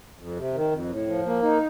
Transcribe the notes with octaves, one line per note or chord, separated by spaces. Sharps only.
F2
C3
D#3
F2
A2
F3
A#3
D#4